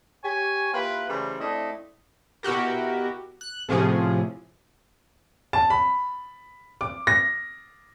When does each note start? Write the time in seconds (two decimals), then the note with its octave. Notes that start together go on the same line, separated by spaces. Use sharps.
0.24 G4 C#5 G#5
0.73 A#3 E4 F4 G4 B4
1.10 C#3 E3 G3 A3 A#4 C5
1.40 A3 C4 D4 E4 D#5
2.43 B2 E4 F#4 G4 A#4
3.41 F#6
3.69 A2 C3 F3 C#4 G#4
5.53 A5
5.70 B5
6.81 D6
7.07 A#6